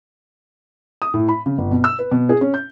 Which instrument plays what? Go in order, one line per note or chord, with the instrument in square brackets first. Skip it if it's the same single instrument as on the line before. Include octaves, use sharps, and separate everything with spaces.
[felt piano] D#6
A2
B5
C#3
G1
B2
E6
B4
B2
G#4
C#4
G6